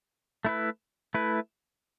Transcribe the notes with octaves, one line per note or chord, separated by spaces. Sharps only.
A3 E4 B4
A3 E4 B4